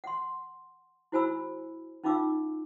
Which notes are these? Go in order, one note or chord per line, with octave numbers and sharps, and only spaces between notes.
F#5 C6
E4 F#4 C5 G#5 B5 E6
C#4 D#4 F4 F5 D6 E6